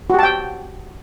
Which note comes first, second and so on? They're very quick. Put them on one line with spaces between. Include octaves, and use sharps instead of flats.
F#4 G4 A5 G5